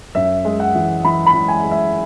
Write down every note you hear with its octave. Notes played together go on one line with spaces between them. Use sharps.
F#2 E5
G#3
F#5
E3
E3 B5
B5
E3
G#5
G#3
E5